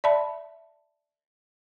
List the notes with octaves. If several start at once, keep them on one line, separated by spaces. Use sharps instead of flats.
D5 E5 A5 B5